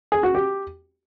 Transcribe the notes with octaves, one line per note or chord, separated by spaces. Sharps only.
G#4
F#4
G4